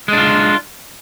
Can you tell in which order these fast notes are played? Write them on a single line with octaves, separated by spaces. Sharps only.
G#3 D4 F4